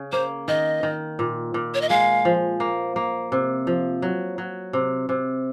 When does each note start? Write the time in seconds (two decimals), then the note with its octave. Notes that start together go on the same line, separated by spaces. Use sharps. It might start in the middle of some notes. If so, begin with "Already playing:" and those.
Already playing: C#3
0.12 A#3 C5
0.48 D#3 D#5
0.83 D#3
1.19 A#2
1.54 A#2
1.74 C#5
1.82 D#5
1.89 G#3 F5
2.25 F3
2.60 A#3
2.96 A#3
3.32 C3
3.67 F3
4.02 F#3
4.38 F#3
4.73 C3
5.09 C3